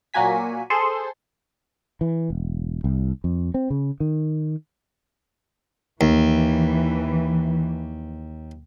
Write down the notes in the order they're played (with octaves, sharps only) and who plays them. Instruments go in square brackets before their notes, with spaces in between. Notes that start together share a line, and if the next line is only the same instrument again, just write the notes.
[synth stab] A#2 F#3 A#3 F#4 G#5 B6
G#4 A4 C5 C6
[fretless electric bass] E3
E1
C2
F2
C4
C#3
D#3
[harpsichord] D#2 [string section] E3